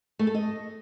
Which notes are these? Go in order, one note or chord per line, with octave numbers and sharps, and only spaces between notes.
A3
A4
D#5